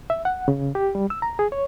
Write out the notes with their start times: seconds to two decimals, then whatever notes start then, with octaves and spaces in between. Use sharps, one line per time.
0.10 E5
0.25 F#5
0.48 C#3
0.75 G4
0.95 G3
1.10 E6
1.22 A#5
1.39 G#4
1.52 C#5